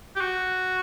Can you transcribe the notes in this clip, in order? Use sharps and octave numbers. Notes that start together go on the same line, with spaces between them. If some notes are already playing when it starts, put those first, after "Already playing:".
G4
F#4